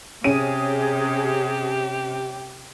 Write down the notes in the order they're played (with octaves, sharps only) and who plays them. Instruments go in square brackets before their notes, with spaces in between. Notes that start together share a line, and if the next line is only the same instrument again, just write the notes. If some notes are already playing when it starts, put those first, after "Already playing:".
[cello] C3 [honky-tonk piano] C#4 D#7 [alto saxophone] G4 [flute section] G#4